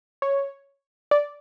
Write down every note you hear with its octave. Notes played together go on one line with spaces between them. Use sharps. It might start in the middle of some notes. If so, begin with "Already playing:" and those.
C#5
D5